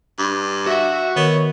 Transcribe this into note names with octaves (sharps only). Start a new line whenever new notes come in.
G2
F#4 E5 F#5
D#3 B3 A#4 C#5